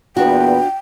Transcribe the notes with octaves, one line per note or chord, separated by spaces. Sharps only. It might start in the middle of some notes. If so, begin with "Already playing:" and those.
E2 A#2 B3 D4 F#4 G5